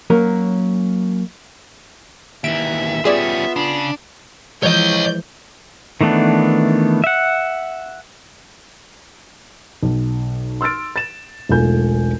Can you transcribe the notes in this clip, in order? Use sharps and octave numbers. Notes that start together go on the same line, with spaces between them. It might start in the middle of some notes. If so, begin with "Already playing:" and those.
F#3 A#3 C#4 A#4
D#2 E3 E5 D7
G3 B3 C#4 F4 G#4 D5 E5
C#3 D4
E3 F3 G#3 C#5 D#5 G6
D#3 E3 A3 B3 D4
E5 F#5
B1
C6 E6 F6 A6 D7
A6 E7
E1 B1 A3 F4 G#5 G6